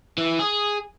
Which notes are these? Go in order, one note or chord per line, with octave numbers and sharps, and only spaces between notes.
E3
G#4